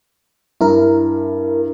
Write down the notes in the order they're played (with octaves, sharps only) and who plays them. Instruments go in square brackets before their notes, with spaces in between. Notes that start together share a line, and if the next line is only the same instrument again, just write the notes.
[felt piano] G2 [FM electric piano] E4 A#4